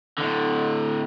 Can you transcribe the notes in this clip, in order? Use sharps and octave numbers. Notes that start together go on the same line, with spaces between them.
A2 D3